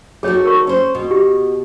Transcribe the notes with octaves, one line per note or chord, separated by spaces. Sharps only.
A3 D#4 F#4 G#4 C#5
A#4 C#6
C#4 C5
B2
G4